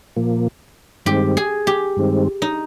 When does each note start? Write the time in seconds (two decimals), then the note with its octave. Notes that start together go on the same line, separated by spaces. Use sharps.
0.16 A#2 F3 A#3
1.06 G2 D#3 G#3 C4 G4
1.37 G#4
1.67 G4
1.97 G2 D#3 G#3 C4
2.42 D#4